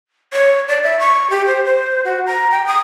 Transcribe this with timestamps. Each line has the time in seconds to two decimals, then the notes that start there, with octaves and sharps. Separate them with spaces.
0.33 C#5
0.68 D5
0.83 E5
0.99 C#6
1.30 G4
1.46 C5
1.65 C5
2.05 F#4
2.26 A#5
2.51 G5
2.67 D#6